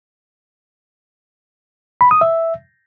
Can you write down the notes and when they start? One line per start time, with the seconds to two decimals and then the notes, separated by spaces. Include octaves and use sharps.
2.01 B5
2.11 D#6
2.21 E5